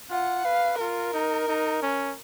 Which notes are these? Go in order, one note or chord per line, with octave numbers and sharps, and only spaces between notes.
F4 F#5
B4 F5
F4 A#4
D#4
D#4
C#4